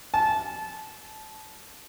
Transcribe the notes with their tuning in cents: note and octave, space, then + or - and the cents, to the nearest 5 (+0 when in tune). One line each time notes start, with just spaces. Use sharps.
A5 -20